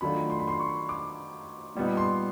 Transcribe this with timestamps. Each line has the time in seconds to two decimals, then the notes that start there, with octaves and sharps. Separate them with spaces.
0.01 D#3 F#3 A3 D4 F4 B5
0.30 C6
0.39 B5
0.48 C6
0.59 C#6
0.89 D6
1.75 A#2 G3 B3 D#4
1.97 C6